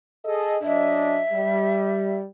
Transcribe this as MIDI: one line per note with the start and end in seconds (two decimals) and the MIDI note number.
0.25 0.55 68
0.25 0.55 69
0.25 0.55 75
0.62 1.20 42
0.62 1.20 62
0.62 1.20 75
0.62 2.16 76
1.32 2.25 55